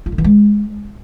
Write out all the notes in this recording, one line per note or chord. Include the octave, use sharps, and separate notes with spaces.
F4
D3
E3
G#3